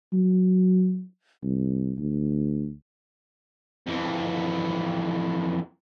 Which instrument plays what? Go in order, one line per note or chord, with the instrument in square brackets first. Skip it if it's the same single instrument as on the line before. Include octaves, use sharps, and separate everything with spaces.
[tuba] F#3
C2
D2
[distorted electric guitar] F2 E3